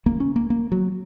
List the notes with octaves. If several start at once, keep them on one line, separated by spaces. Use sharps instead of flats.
C#2 C#3 A#3
C#4
A#3
A#3
F#3